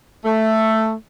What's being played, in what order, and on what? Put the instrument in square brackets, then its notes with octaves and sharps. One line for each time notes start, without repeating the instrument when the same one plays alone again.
[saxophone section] A3